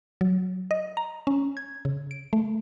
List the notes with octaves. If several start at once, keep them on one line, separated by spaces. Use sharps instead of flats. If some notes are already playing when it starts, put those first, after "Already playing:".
F#3
D#5
A#5
C#4
G#6
C#3
D7
A3